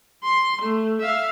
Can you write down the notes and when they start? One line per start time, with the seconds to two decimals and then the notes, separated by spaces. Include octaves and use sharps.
0.24 C6
0.62 A3
1.01 E5 F5